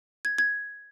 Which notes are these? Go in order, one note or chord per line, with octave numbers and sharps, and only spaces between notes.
G#6
G#6